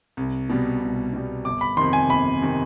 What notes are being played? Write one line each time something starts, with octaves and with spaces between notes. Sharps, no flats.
C2
B2 G3
C2
B2 G3
G1 D6
B5
F2 C3 D#3 C6
G#5
G1 B5
C3 D#3